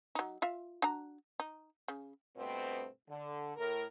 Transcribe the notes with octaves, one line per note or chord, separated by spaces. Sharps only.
F#3 D#4
F4 E5 F5
D4 F#4 A#5
D#4
C#3
G2 B2 A3 B3 C4
D3
A2 A#4